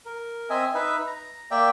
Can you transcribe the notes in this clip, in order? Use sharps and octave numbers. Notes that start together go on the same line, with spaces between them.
A#4
C4 D#5 E5 G#5
D#4 B4 E5
A#5
A#3 D5 E5 G5